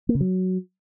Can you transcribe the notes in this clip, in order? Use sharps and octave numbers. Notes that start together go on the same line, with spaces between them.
A#3
C#3
F#3